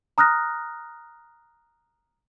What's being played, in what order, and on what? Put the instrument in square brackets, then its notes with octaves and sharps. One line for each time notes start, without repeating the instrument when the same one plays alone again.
[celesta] A#5 D#6 F6 F#6 A#6